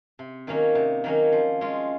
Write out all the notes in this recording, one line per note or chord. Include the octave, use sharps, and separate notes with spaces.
C3
D#3 F#3 A#3 C#4
C3
D#3 F#3 A#3 C#4
F3
G#3 C#4 F4